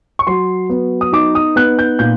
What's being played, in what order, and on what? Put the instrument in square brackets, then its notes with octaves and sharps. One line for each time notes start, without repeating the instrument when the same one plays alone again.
[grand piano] C#6
F#3 C6
B3
D#6
D#4 D6
D#6
B3 F#6
G6
A#2 G6